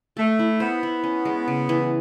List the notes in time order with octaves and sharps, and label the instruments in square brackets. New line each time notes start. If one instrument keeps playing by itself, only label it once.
[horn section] A3 [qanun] A4
[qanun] E4
[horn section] B3 [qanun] C5
[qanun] E4
C#4
G#3
C#3
E3